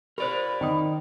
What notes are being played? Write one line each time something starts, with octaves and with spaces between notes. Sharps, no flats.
G4 A#4 C5 D5 B5
D#3 E4 G5 D#6